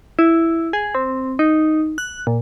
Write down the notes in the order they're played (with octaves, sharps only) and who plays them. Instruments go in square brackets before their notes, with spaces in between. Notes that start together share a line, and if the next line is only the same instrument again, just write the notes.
[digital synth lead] E4
G#4
C4
D#4
F#6
A#2